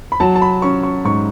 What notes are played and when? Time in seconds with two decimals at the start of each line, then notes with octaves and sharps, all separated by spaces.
0.12 B5
0.20 F#3 A5
0.36 A5
0.42 B5
0.62 C#4 C#6
0.83 C#6
1.05 G#2 C#6